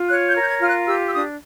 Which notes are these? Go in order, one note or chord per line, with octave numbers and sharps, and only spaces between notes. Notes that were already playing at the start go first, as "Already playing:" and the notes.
Already playing: F4
C#5 F#6
G6
A#4
G6
G#6
F4 F6
F#6
G4 E6
E6
D4 D#6